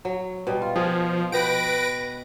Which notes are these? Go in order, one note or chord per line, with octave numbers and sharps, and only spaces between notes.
F#3
B2 G3
F4
F3 G#4
B2 B4 F#5 G5 A#6 D7